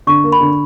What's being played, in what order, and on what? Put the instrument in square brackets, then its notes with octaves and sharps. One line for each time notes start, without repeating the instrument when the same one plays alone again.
[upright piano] D3 [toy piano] C#6
[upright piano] A#3
[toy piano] B5
[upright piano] D3